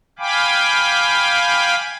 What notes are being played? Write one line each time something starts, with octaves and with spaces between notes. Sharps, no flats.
F5 G5 G#5 B5 D6